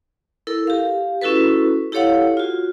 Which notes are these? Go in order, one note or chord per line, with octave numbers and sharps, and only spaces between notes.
E4 A4 A#4
G4 F5
C#4 E4 F#4 A4 B4
E4 G4 A4 C#5 F5 F#5
F4 F#4